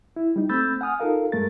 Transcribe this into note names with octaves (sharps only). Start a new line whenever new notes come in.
E4
G3 D#4
A3 C4 B5 E6 G6 A6
F#5 G#5 D#6 F6
D#4 F4 A4 A#4 F5
G2 G#3 A3 A#4 A6